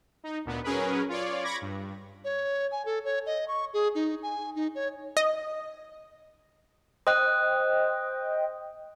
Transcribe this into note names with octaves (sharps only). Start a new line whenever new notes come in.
D#4
D2 A#2 B3
F#3 C#4 G#4 A#4 B4
F4 C#5 D5
B5 C#6 D6 G#6 A#6
G2
C#5
G#5
A4
C#5
D#5
C#6
G#4
D#4
G#5
D#4
C#5
D#5
C5 D#5 G5 D#6 F#6